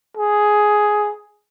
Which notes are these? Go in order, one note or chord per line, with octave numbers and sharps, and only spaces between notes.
G#4